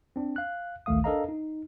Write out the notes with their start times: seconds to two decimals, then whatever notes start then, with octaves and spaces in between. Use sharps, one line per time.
0.16 C4 D4
0.36 F5 F#6
0.86 A1 D2 D#3 A3 F5 D#6
1.04 D4 A4 A#4 D#5 F5 A#5
1.29 D#4